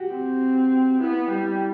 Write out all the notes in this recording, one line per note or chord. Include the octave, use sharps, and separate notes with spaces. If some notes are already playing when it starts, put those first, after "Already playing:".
Already playing: F#4 G4
C4
B3 E4
G3